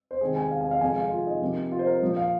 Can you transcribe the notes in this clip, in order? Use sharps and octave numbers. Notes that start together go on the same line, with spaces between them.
C5
C3 D#3 G#3 G#4
G#5
F5
G#5
F5
F2 C3 G#3 G#5
F5
F4
D#4
C3 F3 A#3
F4
C5
A#4
A#2 F3 A#3
F5